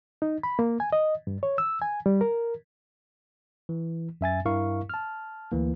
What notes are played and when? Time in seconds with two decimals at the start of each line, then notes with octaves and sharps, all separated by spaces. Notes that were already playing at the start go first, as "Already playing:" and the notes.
0.22 D#4
0.43 B5
0.59 A#3
0.80 G#5
0.92 D#5
1.27 G2
1.43 C#5
1.58 E6
1.82 G#5
2.06 G3
2.21 A#4
3.69 E3
4.21 F#2 E5 G#5 A6
4.46 G2 E4 A#4 F5 C#6
4.90 A5 F6
5.52 D2 E3 A#3